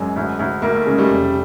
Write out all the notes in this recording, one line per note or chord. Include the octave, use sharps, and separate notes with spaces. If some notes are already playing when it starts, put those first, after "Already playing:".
Already playing: F#2 F#3 G#3
D2
D2
D2 A#3
A3
C#3 G#3
G3 A3
F1